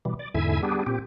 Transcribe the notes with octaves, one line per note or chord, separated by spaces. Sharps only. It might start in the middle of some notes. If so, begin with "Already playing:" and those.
B2 E3 G3
D5
E2 G#2 D3 E4 E5 G#5
G3 B3 D4 G4 G#4
A#2 C4 G4